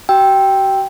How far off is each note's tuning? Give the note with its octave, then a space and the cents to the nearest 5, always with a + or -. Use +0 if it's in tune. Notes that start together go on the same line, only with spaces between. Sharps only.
F#4 +45 G5 +0 E6 +0